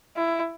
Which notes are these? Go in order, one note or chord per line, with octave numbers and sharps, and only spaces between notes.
E4